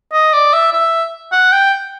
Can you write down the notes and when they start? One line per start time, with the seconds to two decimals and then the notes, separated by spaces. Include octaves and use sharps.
0.13 D#5
0.33 D5
0.53 E5
0.73 E5
1.32 F#5
1.52 G5